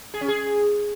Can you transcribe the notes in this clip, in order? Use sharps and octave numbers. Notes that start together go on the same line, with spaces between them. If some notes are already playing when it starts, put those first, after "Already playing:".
G#4
C#4
G#4